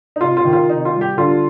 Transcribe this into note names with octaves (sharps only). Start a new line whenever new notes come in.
D#4
C3 F4
F4
D#3
F4
C3 D#4
F4
G3
G4
D3 F4